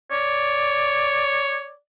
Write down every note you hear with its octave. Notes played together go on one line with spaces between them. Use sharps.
C#5 D5